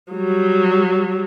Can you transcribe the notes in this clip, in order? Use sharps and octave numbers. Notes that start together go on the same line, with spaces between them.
F#3 G3